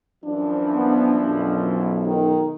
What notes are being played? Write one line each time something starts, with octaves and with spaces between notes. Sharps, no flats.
F#2 E3 F3 D4
B3
B1
D#3